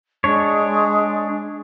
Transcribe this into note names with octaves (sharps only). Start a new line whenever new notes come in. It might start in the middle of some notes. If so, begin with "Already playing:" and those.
G#3 D4 C#5